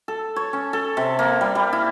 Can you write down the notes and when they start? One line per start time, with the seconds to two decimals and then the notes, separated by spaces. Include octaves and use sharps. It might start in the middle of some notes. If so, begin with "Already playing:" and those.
0.08 A4
0.36 C#5
0.53 C#4
0.73 A4
0.97 C3
1.19 A#3
1.41 G3
1.55 G3
1.73 E4